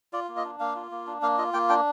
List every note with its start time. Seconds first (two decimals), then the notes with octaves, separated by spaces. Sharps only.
0.13 F4 D5
0.28 A#3
0.37 D#5
0.45 D4
0.60 A#3 F5
0.75 F4
0.91 A#3
1.07 D4
1.22 A#3 F5
1.38 F4 D#5
1.53 A#3 G5
1.69 D4 G5